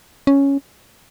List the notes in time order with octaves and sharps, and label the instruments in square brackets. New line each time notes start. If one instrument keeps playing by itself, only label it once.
[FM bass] C#4